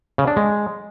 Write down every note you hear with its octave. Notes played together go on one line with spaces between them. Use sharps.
C#3
D4
G#3